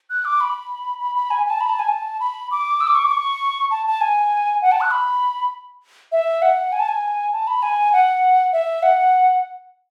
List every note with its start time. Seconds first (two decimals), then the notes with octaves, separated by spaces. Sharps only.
0.10 F#6
0.25 D6
0.41 B5
1.00 B5
1.15 B5
1.31 G#5
1.46 G#5
1.50 A5
1.61 B5
1.70 A5
1.79 G#5
1.88 A5
2.20 B5
2.51 D6
2.81 E6
2.87 D6
2.95 C#6
3.02 D6
3.11 C#6
3.71 A5
3.87 A5
4.01 G#5
4.62 F#5
4.72 A5
4.81 F#6
4.91 B5
6.12 E5
6.42 F#5
6.72 G#5
6.80 A5
6.88 G#5
7.33 A5
7.47 B5
7.63 G#5
7.93 F#5
8.53 E5
8.83 F#5